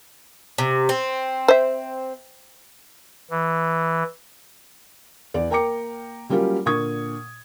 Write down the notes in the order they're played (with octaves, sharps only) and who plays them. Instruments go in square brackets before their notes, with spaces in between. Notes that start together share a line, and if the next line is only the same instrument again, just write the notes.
[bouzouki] C3
C4
[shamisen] C5 E5
[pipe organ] E3
[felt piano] E2 D5
A#3 A#4 G5 A#5 D6 C#7
F#3 G3 A#3 C#4 F4 G4
A#2 D3 C#6 D#6 G#6